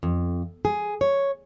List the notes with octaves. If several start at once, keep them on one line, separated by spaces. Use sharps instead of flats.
F2
G#4
C#5